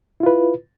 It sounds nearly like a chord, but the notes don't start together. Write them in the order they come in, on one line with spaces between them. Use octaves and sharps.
E4 F4 B4